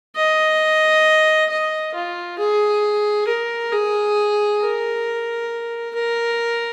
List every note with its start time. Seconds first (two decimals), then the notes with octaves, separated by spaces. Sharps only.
0.16 D#5
1.50 D#5
1.94 F4
2.39 G#4
3.27 A#4
3.72 G#4
4.61 A#4
5.95 A#4